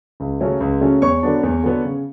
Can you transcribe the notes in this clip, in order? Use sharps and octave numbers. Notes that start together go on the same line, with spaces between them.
C#2
C#3 F#3 A3 C#4
C#2
C#3 F#3 A3 C#4
E2 C#5 C#6
D3 F#3 B3 D4
E2
D3 F#3 B3 D4
C#3